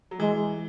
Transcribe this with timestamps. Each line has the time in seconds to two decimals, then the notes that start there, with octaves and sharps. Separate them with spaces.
0.11 F#3
0.20 E3 G#3